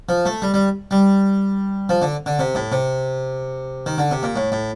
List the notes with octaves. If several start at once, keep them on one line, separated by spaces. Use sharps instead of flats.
F3
A3
G3
G3
G3
F3
D3
D3
C3
A2
C3
D#3
D3
C3
A#2
A2
A2